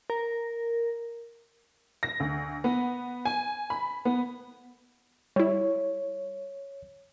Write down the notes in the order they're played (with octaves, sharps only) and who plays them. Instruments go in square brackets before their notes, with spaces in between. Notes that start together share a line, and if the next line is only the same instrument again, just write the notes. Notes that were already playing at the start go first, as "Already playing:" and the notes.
[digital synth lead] A#4
[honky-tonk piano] A#6
D2
B3
G#5
B5
B3
[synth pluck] G3 E4 [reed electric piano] C#5